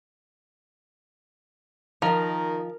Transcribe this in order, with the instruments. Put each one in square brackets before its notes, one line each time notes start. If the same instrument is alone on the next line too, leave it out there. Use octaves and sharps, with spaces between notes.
[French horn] D#3 [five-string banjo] F3 [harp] A#4